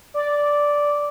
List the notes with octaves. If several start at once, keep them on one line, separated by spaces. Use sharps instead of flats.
D5